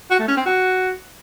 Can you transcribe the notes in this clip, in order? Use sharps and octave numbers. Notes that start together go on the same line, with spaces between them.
F#4
A3
C#4
C4
F#4